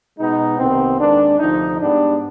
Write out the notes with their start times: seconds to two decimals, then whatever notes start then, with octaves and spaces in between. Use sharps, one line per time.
0.19 B2 G#3 B3 D#4
0.59 C2 C3 D#3 B3 C4
0.99 D#2 D#3 G#3 D4
1.39 D2 C3 F3 D#4
1.79 G#2 G3 B3 D4